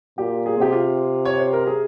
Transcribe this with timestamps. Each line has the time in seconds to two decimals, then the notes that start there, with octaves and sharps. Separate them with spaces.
0.18 A#2 G4
0.46 G#4
0.58 C3 G4
0.72 F4
1.25 C#5
1.39 C5
1.53 A#4
1.67 G#4